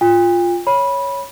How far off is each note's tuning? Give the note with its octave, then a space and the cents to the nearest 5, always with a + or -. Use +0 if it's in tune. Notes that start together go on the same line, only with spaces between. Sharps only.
F4 +0 G5 +45
C#5 +0 B5 -15